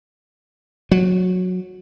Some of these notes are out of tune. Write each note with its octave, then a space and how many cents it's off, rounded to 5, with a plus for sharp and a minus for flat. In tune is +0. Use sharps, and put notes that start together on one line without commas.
F#3 -15